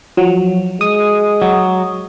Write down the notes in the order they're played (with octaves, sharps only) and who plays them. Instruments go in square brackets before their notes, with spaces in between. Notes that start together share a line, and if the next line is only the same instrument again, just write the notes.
[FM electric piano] F3 F#3
[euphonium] G#3 [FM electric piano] D#6
[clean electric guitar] F#3